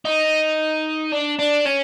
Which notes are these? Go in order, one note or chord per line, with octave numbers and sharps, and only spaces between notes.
D#4
D4
D4
C#4